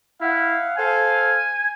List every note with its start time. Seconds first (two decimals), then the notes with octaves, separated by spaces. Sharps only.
0.21 E4 F5 F#5
0.78 A4 C5 F5 G#5